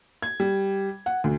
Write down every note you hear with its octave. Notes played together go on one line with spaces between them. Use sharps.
G#6
G3
F#5
D2